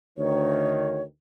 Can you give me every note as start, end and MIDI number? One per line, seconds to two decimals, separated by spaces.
0.18 1.02 38
0.18 1.02 51
0.18 1.02 73